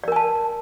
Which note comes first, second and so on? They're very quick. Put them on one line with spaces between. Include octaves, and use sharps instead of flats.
D5 A#4 G#5 A5